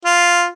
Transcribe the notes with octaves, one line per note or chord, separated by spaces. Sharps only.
F4